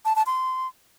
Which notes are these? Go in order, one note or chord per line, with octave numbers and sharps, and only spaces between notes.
A5
A5
C6